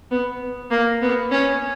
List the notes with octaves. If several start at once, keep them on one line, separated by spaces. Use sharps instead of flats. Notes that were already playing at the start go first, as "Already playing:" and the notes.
B3
A#3
B3
C#4